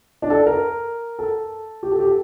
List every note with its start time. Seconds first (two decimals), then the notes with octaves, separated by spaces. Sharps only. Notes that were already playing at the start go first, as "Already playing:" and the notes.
0.22 D4
0.30 A4
0.46 A#4
1.19 A4
1.83 G4
1.91 A4
1.99 G4
2.07 A4